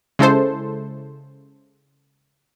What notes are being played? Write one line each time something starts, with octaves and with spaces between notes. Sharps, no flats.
C#3 G#3 E4 A4 C5